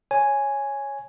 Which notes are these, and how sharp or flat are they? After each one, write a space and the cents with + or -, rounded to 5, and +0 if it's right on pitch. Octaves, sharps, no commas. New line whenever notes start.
C#5 +0 G#5 +0